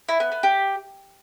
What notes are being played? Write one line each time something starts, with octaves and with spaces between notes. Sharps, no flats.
E4
B3
B3
G4